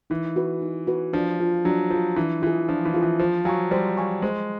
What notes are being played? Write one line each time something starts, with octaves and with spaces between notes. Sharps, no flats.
E3 D#4
F#4 B4
D#4
F#4 B4
F3 D4
F4 G#4
F#3 D4
F3 F4
G#4
E3 D4
E3 F4 G#4
F3 D4
E3
F4 G#4
E3
F3 C5
F#3 F5 G#5 C#6
G3 C5
F5 G#5 C#6
G#3 C5